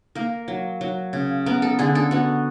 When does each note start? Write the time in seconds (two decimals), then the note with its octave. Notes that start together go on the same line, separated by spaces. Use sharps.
0.15 A#3 A#4
0.48 F#3
0.81 F#3
1.13 C#3
1.46 B3 A#4
1.62 A4
1.79 D3 G#4
1.95 A4
2.11 B3 F#4